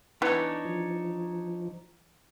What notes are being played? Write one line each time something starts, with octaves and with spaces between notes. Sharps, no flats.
E3 B3 D4 D#4 C#5
F3